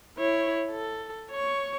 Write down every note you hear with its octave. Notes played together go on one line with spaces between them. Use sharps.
E4 C#5
A4
C#5 C#6